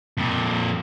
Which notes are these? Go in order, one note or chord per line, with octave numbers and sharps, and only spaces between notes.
F2 A#2